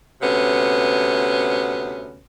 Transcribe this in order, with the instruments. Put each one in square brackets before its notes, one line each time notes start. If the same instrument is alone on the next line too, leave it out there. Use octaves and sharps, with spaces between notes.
[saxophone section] D2 C3 B3 C#4